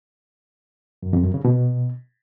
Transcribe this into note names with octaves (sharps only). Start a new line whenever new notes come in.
F#2
F2
F#2
C#3
B2